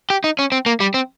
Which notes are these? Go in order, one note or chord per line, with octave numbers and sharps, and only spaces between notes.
G4
D#4
C#4
C4
A#3
G3
C4